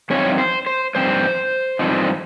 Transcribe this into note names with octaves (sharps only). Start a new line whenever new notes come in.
G2 F3 C4 D#4 C#5
C5
C5
G2 F3 C4 D#4 C5
G2 F3 C4 D#4